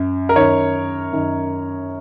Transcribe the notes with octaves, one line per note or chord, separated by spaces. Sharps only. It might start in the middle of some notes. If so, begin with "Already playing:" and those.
Already playing: F#2
A#4
F#2 D#3 C#5
F#2 D#3